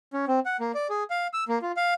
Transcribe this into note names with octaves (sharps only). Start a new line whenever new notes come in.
C#4
C4
F#5
A#3
D5
G#4
F5
E6
A#3
F4
F5